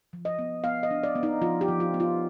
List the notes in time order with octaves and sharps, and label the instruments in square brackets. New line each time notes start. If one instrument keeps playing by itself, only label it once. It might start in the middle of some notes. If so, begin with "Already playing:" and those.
[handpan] F3
D#5
B3
B3 F5
D#5
D4
D5
B3
D#4
F3 F4
G4
F3
F4
B3
F4